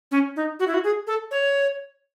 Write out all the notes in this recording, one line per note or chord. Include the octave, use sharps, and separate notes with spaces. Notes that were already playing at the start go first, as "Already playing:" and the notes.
C#4
D#4
F#4
E4
F#4
G#4
A4
C#5